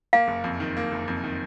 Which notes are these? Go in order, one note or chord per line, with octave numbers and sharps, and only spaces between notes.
A#3 F5
F#1
F2
D#3
A#3
F#1
F2
D#3